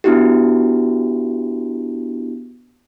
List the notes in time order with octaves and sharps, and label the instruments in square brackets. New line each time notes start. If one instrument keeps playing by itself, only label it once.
[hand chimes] B3 D4 E4 F#4 G4